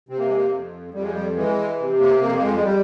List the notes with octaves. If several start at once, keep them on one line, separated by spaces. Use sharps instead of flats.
C3 C4
A#3
G#3
A#3
F2
F2 G3
G#3
G3
E3 G#3
C3
A#3
F2 A#3
A#3
G#3
G#3
G3